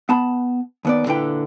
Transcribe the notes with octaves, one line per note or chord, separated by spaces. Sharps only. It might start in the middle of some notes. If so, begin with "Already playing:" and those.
B3 A5 B5
D#2 B3 D5
A#2 D3 E4 B4 G5